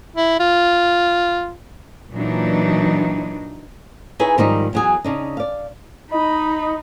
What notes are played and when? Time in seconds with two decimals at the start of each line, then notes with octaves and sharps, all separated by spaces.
0.16 E4
0.39 F4
2.13 A#2 E3 F#3 D4 D#4
4.19 D#4 E4 G#4 B4 C#5
4.38 G#2 D#3 F3 G3 C4 D#4
4.73 E2 F#3 G#4
5.04 C#3 D4 D#4
5.37 D5 F5
6.11 D#4 D#5 B5